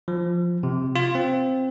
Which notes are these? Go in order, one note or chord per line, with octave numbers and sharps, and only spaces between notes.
F3
C3
F4
C4